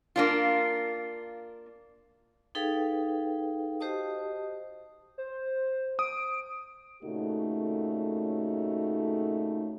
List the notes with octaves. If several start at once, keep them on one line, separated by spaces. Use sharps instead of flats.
A#3 D4 F4
D#4 G#4 A4 B4 F5 G5
F#4 G4 C5 D#5 A5 D#6
C5
D#6 D7
A#2 C#3 A3 D#4 F#4 A4